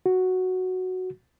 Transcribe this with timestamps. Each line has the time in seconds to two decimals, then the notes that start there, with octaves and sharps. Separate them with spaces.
0.06 F#4